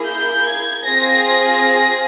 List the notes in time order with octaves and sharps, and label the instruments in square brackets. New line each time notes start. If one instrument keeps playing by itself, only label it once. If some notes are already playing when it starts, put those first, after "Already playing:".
Already playing: [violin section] A#3 E4 G#4
G6
G#6
C4 F4 G#4 A#6
A#6
A#6